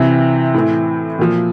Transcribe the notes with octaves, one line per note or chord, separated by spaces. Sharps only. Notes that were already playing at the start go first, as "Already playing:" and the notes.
Already playing: C3 E3 C4
A2 E3
A#2 F3